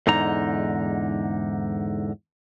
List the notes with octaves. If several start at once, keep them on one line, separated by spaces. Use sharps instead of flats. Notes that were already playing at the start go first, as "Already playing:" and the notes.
E2 G#2 D3 D#4 A#5